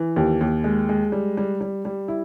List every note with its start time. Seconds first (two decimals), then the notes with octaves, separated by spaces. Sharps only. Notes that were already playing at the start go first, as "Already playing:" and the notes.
Already playing: E3
0.16 D#2
0.41 D#2
0.64 G#3
0.89 G#3
1.12 G3
1.37 G3
1.61 G3
1.85 G3
2.08 E4